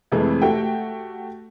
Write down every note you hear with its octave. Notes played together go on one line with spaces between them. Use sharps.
F2 C3 E3 G#3 A3 E4
A3 F#4 G4 G5